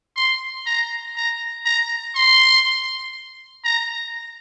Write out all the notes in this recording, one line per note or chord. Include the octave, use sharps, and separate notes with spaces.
C6
A#5
A#5
A#5
C6
A#5